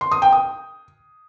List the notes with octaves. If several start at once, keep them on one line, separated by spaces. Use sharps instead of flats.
C6
D#6
G5
D#6